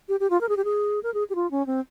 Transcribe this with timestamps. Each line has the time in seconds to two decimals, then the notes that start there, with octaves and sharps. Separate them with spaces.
0.09 G4
0.20 G4
0.30 F4
0.41 A#4
0.49 G#4
0.57 G4
0.65 G#4
1.03 A#4
1.14 G#4
1.30 G4
1.35 F4
1.51 C#4
1.67 C4